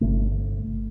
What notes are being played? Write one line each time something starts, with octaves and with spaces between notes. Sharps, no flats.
G1 C3 A3